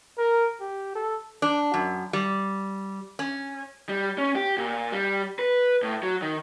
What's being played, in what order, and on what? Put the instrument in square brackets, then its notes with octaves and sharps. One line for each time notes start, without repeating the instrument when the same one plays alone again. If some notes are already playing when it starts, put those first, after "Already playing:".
[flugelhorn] A#4
G4
A4
[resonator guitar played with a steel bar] D4
F#2
G3
C#4
[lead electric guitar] G3
C#4
G4
A#2
G3
B4
A2
F#3
D#3